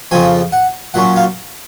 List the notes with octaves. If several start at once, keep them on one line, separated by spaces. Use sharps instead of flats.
F2 C#3 F3 C4 G#5
F#5
A#2 F#3 C#4 F#5
F5